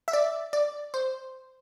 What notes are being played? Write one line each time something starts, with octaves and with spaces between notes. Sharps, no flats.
E5
D5
D5
C5